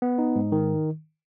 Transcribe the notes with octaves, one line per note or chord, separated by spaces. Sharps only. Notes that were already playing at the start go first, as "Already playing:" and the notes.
B3
D#4
G#2
D#3